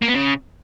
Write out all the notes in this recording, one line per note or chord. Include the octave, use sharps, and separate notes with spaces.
A#3
B3
C#3